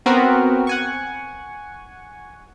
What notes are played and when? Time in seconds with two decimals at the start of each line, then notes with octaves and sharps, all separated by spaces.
0.06 B3 C4 F#4 A#4
0.67 F#5 G#5 C#6